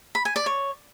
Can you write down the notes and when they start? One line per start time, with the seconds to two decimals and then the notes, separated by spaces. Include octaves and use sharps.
0.15 B5
0.25 G#5
0.36 D5
0.46 C#5